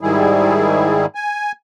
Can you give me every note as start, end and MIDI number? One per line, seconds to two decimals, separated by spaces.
0.01 1.06 44
0.01 1.06 51
0.01 1.06 55
0.01 1.06 64
0.01 1.06 68
1.15 1.52 80